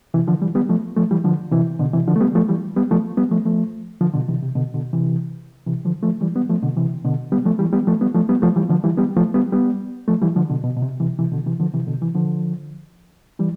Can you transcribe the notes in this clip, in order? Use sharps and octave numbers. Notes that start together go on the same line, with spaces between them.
C3 E3
D3 F3
E3 G3
G3 B3
F3 A3
F3 A3
E3 G3
D3 F3
C3 E3
B2 D3
C3 E3
D3 F3
A3
G3 B3
F3 A3
E3 G3
G3 B3
F3 A3
G3 B3
F3 A3
F3 A3
D3 F3
B2 D3
C3 E3
C3
B2 D3
B2 D3
C3 E3
C3 E3
D3 F3
F3 A3
E3 G3
G3 B3
F3 A3
B2 D3
C3 E3
B2 D3
G3 B3
F3 A3
E3 G3
G3 B3
F3 A3
G3 B3
F3 A3
G3 B3
F3 A3
E3 G3
D3 F3
E3 G3
G3 B3
F3 A3
G3 B3
G3 B3
F3 A3
E3 G3
D3 F3
B2 D3
B2
B2
C3
C3 E3
C3 E3
B2 D3
C3 E3
D3 F3
C3 E3
B2 D3
C3 E3
D3 F3
E3 G3